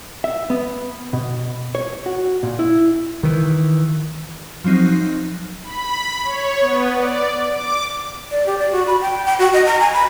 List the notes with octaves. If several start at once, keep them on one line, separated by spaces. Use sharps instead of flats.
E5
B3
B2
C#5
F#4
A#2
E4
D#3 E3
F3 F#3 C4 D#4
B5
C#5
B3
D5
D6
D5
G4
D5
F#4
B5
G5
G5
F#4
D#5
A#5
G#5
B5